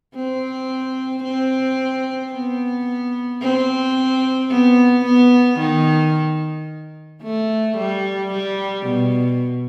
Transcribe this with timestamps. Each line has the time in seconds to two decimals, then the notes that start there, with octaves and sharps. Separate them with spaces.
0.15 C4
1.24 C4
2.33 B3
3.42 C4
4.51 B3
5.05 B3
5.60 D#3
7.23 A3
7.78 G3
8.32 G3
8.87 B2